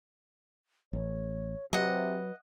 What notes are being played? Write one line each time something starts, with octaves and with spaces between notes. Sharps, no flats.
A1 C#5
C3 F#3 B4 D#5 F#5